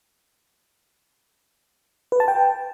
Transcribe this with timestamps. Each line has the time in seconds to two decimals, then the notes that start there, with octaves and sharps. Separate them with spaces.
2.12 B4
2.20 A5
2.28 G5